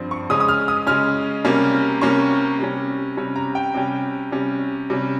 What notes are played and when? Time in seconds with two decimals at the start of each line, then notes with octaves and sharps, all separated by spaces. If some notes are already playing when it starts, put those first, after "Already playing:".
Already playing: G2 F3 C4
0.11 C#6
0.30 C#3 G#3 C#4 D#6
0.40 D#6
0.48 F6
0.68 D#6
0.87 C#3 G#3 C#4 F6
1.45 C3 G3 A#3 C#4
2.01 C3 G3 A#3 C#4 C#6
2.59 C3 G3 C#4
3.17 C3 G3 C#4
3.36 A#5
3.55 G5
3.75 C3 G3 C#4
4.32 C3 G3 C#4
4.90 C3 G3 C#4